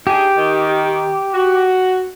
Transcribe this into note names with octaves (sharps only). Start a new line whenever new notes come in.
D4 D#4 G4 G#4
D#3
F#4